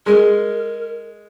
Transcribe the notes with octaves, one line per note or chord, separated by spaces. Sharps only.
G#3 A#4